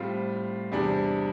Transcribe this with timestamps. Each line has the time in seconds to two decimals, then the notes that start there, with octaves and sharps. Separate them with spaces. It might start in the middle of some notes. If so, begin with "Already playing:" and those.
Already playing: A2 G3 C4 F4
0.72 E2 C3 G3 D4